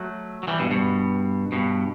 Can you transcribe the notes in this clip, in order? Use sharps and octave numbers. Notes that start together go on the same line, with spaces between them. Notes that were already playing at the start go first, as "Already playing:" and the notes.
Already playing: F#3 A3
F#3
E3 G3
G2 B2
G2 B2
G2 B2